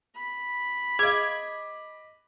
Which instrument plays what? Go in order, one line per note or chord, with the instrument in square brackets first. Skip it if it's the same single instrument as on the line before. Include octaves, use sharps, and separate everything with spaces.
[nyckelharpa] B5
[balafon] G#4 F5 [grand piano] D#5 D6 [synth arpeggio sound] G#6